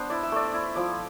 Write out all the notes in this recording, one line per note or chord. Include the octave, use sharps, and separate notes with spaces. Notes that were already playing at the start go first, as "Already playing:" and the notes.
Already playing: B3 D4 C5
E4 D5
E5
A3 D5
E4
F3 D5